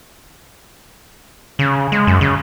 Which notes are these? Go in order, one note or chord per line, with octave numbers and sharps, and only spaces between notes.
C#3
G#3
F#2
C#3